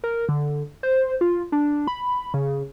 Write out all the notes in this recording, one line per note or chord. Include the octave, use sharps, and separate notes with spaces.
A#4
D3
C5
F4
D4
B5
C#3